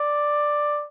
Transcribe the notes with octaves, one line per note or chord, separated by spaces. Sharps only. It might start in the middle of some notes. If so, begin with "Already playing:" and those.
Already playing: D5